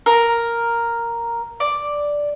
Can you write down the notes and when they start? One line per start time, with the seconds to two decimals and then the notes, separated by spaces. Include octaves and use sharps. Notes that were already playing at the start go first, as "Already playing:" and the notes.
0.06 A#4
1.60 D5